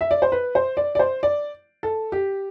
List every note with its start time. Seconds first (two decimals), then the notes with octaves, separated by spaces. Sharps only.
0.01 E5
0.11 D5
0.22 C5
0.32 B4
0.55 C5
0.77 D5
0.95 D5
0.99 C5
1.23 D5
1.83 A4
2.12 G4